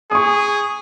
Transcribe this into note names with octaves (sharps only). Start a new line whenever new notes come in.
G#4 C#6 D#6